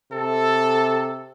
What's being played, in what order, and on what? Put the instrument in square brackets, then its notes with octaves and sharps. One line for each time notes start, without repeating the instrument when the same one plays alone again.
[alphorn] C3 [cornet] A4